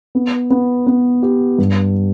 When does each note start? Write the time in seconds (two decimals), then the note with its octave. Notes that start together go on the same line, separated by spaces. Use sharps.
0.15 B3
0.50 B3
0.87 B3
1.23 G4
1.58 G2